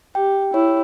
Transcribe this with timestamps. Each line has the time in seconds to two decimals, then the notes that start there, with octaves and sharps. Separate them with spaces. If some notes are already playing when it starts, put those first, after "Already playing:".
0.15 G4 G5
0.53 E4 C#5